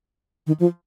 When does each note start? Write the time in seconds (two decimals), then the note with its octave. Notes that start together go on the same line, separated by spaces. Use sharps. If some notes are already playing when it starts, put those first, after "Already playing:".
0.47 D#3
0.60 F3